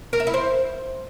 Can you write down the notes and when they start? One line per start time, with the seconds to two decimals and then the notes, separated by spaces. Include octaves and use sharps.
0.13 A#4
0.20 E5
0.27 E4
0.34 C5